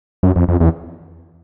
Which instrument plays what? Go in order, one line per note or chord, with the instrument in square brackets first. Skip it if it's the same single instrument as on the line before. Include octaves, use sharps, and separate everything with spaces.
[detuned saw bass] F#2
F2
F2
E2